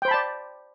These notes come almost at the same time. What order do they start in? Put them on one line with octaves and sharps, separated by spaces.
G5 C5 B5 A5 D5